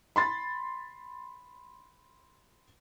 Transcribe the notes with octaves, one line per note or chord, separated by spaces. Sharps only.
B5 C6 A6